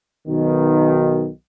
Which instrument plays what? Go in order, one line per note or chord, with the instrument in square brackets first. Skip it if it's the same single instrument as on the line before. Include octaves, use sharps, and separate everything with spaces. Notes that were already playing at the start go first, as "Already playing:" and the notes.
[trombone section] B1 B2 D#3